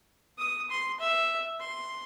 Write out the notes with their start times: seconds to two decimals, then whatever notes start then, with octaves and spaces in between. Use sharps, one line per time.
0.38 D#6
0.70 C6
1.00 E5
1.60 C6